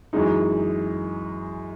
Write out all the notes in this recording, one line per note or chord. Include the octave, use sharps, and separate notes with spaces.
F#2 E3 G#3 D#4